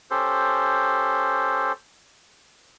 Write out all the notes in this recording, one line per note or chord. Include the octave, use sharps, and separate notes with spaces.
C#4 G4 A4 C5